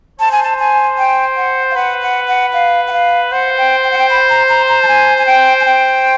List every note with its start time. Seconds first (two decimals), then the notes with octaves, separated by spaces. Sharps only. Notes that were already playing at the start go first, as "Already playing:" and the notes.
0.20 C5 A5
0.32 G#5
0.43 A5
0.59 G#5
0.98 G5
1.37 F#5
1.71 F5
1.75 B4 F#5
2.02 F#5
2.28 F#5
2.53 F5
2.88 F#5
2.93 F5
3.31 C5 F#5
3.58 G5
3.84 G5
3.91 F#5
3.98 G5
4.10 B5
4.29 A#5
4.49 A#5
4.69 A#5
4.82 A5
4.88 G#5
5.18 G#5
5.26 G5
5.61 G#5
5.65 G5